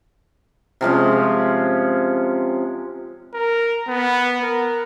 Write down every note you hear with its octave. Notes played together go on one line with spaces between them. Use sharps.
C3 F3 G#3 C#4
A#4
B3
A#4